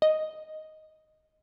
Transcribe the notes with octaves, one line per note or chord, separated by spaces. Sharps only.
D#5